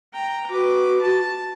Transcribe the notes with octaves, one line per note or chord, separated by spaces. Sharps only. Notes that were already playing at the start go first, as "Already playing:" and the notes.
G5 A#5
F#4 B4 D6
A5